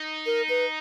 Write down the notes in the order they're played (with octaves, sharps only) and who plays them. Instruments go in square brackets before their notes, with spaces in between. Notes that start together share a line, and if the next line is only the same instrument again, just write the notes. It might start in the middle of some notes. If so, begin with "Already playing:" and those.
Already playing: [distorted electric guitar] D#4
[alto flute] A#4
B4